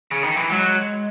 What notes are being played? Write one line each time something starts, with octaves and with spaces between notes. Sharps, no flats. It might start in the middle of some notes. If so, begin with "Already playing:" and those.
C#3
D#3
E3
F#3 G#3